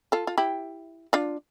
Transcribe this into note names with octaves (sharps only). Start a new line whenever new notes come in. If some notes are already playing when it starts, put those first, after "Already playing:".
F4 A4
F4
E4 G4
D4 F4